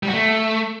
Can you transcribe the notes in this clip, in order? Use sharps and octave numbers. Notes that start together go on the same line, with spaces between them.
G3
F#4
A3